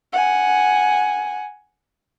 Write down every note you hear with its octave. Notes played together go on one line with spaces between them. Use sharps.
F#5 G#5